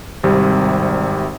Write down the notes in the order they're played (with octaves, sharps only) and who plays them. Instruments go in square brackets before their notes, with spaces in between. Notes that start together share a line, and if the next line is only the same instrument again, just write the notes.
[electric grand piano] G#1 C3 G3